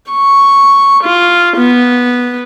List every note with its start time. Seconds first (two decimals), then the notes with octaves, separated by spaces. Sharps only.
0.11 C#6
1.04 F4
1.57 B3